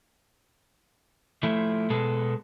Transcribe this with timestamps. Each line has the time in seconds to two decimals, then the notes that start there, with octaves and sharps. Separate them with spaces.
1.43 F3 A3 E4 F4
1.90 B2 G#3 B3 A4